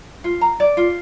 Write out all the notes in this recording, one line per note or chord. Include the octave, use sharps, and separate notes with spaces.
F4
A#5
D5
F4